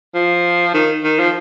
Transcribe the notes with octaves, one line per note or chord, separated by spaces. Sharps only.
F3
D#3
D#3
F3